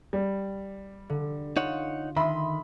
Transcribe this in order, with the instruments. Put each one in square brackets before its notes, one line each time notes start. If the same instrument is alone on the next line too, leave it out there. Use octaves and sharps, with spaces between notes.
[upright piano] G3
[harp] D3
[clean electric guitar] D#4 C#5 F#5 [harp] F4 E7
[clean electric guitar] D#3 [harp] E5 C6 D#6 [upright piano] B5